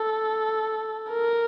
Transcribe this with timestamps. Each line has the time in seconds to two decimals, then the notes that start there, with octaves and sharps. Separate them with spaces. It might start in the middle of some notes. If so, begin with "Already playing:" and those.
Already playing: A4
1.11 A#4